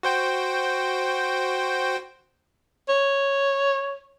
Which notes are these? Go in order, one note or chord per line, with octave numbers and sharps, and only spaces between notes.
F#4 C5 G5
C#5